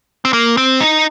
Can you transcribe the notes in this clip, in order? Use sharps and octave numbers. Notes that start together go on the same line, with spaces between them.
C4
A#3
C4
D#4